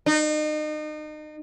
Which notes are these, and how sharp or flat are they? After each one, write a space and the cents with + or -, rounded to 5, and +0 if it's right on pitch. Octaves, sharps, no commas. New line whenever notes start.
D#4 -35